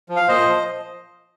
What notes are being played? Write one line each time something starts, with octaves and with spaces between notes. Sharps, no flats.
F3
F5
A#2 C5 D#5
F3